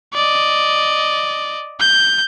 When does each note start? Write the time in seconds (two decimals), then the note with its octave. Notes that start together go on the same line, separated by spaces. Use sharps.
0.14 D5 D#5
1.80 G6